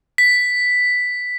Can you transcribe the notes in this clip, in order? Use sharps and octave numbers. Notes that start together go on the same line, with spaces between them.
B6